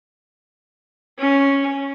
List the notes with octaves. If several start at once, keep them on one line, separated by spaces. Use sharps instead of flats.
C#4